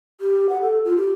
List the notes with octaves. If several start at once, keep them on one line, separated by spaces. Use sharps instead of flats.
G4
F#5
A4
F4
G4